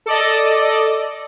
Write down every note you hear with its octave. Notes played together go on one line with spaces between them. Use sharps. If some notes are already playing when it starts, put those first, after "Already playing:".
A4 D5 D#5